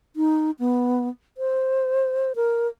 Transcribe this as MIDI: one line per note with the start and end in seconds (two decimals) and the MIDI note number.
0.16 0.51 63
0.59 1.08 59
1.38 2.33 72
2.36 2.68 70